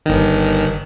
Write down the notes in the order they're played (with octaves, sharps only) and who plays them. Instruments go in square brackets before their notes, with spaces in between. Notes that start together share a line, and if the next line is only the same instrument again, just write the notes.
[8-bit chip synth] G1 D#3